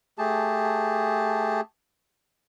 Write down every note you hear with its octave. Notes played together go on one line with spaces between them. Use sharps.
A3 G4 G#4 A5